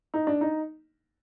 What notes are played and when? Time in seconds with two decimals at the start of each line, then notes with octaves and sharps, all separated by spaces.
0.14 D#4
0.27 D4
0.41 D#4